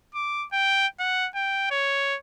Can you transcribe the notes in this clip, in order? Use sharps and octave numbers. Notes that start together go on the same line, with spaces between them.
D6
G5
F#5
G5
C#5